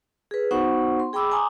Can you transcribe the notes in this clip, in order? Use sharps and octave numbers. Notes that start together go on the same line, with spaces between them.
G#4 B4
B3 D#4 F#4 C5 F#5 C#6
C6
G#4 G5 B5 D6 E6
G#5 A#5 C6 D6 D#6